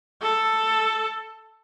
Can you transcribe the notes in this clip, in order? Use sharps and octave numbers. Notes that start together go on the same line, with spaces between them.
A4